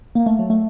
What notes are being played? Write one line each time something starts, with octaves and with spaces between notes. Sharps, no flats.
A#3
A3
F#3
A3